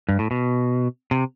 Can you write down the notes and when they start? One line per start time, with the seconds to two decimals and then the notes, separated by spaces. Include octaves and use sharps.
0.09 G2
0.19 A2
0.31 B2
1.11 C3